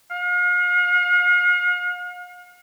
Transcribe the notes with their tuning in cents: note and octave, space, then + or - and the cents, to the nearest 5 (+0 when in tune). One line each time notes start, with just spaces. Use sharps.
F5 +45